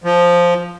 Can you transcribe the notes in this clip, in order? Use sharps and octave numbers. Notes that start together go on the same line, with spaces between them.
F3